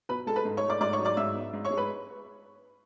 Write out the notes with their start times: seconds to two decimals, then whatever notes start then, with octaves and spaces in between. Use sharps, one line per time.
0.09 B2 B4 B5
0.26 G#3 A4 A5
0.36 B4 B5
0.45 G#2
0.57 C#5 C#6
0.63 A3
0.70 D5 D6
0.80 G#2 D5 D6
0.93 C#5 C#6
0.99 F#3
1.05 D5 D6
1.17 G#2 E5 E6
1.35 B3
1.53 G#2
1.65 C#5 C#6
1.71 G#3
1.77 B4 B5